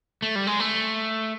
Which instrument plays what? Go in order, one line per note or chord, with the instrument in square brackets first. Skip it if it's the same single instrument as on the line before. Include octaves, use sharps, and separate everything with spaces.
[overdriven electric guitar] A3
G3
G#3
A3